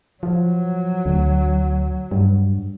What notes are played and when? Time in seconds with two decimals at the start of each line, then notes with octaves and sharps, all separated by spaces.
0.23 F3 F#3
1.06 D2
2.11 G2